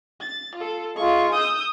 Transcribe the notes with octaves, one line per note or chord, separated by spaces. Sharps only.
A6
F4 A4
G#3 F4 C#6
D#6 E6 G6